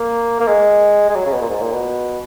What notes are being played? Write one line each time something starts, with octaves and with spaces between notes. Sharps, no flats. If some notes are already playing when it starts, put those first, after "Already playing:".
Already playing: A#3
A#3
G#3
G#3
F#3
C#3
B2
A#2
G#2
A#2
B2